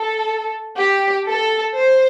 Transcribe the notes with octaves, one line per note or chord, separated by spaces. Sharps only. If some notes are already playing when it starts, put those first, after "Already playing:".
Already playing: A4
G4
A4
C5